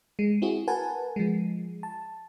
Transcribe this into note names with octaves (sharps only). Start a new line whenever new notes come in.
G#3
C4 E4 F#4 G#4
A#4 B4 F#5 G#5 A5
F3 G#3
A5